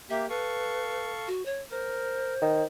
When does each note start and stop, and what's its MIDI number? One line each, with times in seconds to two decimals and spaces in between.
0.10 0.26 58
0.10 0.26 67
0.10 0.26 76
0.30 1.28 69
0.30 1.10 71
0.30 1.28 77
0.30 1.28 85
1.28 1.45 66
1.46 1.61 73
1.71 2.34 70
1.71 2.65 72
2.42 2.63 51